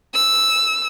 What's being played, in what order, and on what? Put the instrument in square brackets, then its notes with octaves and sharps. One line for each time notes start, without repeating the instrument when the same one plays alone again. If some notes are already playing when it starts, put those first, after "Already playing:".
[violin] E6